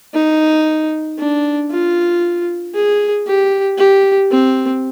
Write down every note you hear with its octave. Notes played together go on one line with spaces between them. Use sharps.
D#4
D4
F4
G#4
G4
G4
C4